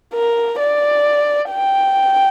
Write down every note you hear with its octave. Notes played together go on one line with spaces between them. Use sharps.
A#4
D5
G5